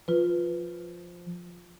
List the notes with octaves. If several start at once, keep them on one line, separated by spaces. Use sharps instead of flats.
F3 F4 B4